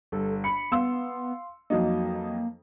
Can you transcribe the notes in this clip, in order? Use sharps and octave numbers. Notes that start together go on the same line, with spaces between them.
G1 A4
B5 C#7
B3 F5 C6 E6
F2 F#3 A#3 D#4